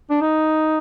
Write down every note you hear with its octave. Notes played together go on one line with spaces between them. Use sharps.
D4
D#4